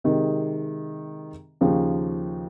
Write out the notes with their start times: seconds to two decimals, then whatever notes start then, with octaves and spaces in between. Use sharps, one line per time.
0.04 C3 D#3 G#3
1.61 D#2 C#3 F3